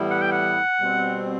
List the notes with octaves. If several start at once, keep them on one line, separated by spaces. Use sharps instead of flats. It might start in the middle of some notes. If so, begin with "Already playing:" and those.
Already playing: A2 E3 G3 B3 E4
F#5
G5
F#5
B2 G3 C4